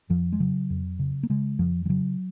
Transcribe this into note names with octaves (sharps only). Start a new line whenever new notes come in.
F2 F3
G#3
C#3 F#3
F2
C#3
A#3
C#3 G#3
F2 F3
F3
C#3 F#3